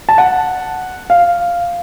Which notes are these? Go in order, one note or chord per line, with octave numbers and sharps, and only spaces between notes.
A5
F#5
F5